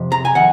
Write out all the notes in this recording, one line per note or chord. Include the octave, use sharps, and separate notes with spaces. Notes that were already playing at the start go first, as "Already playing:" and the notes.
Already playing: F2 C3
A#5
G#5
D#3 F#5